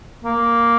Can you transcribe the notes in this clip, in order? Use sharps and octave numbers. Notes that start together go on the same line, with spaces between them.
A#3